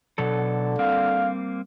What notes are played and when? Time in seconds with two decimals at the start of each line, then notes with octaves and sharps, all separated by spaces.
0.18 B2 D3 F#3 A4
0.79 G3 A#3 C4 F5